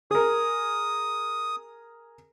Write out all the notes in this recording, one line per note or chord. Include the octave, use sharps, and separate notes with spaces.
G#4 A#4 D#6